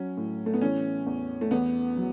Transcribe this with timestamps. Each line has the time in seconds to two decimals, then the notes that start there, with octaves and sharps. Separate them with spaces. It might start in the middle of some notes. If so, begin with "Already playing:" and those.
Already playing: F#3 C#4
0.17 A2
0.46 A3
0.54 B3
0.61 E3 C#4
1.06 E2
1.41 A3
1.51 E2 B3
1.97 F#3